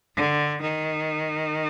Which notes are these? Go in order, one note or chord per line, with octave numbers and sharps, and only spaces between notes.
D3
D#3